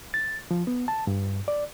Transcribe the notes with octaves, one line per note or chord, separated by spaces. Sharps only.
A6
F3
B3
A5
G2
D5